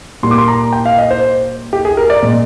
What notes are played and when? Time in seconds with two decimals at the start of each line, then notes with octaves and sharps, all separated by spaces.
0.23 A#2 G3 A#3 C6
0.31 D6
0.38 C6
0.48 A#5
0.73 G5
0.86 F5
0.98 D#5
1.11 C5
1.73 G4
1.85 G#4
1.97 A#4
2.10 D5
2.23 A#2 G#3